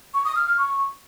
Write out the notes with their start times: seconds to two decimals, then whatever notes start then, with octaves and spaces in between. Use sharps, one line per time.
0.14 C#6
0.25 D#6
0.36 F6
0.47 F6
0.58 C#6